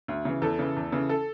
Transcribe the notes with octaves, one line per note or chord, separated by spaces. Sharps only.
D2
C#3 E3
E2 A4
C#3 E3
E2
C#3 E3
A4